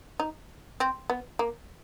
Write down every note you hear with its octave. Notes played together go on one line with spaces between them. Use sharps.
D#4
C4
B3
A#3